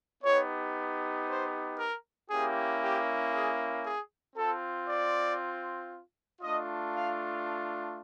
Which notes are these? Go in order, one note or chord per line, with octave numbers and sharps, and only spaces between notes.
B3 D#4 G4 C#5
C5
A#4
A#3 C#4 E4 G4 G#4
G4
G#4
G#4
C4 F4 A4
D5
A3 D4 F4 D#5
F5